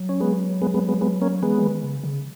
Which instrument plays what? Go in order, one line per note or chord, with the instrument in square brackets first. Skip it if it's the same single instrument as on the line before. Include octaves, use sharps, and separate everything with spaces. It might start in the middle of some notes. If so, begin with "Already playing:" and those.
Already playing: [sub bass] F#3
[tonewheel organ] C#4
G#3 B3
G#3 B3
G#3 B3
G#3 B3
G#3 B3
A#3 C#4
[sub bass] E3 [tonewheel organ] G#3 B3
[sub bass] E3
D#3
C#3
C#3